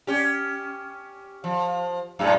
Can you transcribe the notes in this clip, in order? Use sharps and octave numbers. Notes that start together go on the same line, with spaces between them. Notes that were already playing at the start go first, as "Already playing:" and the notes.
C#4 G4
F3
F#2 A2 G3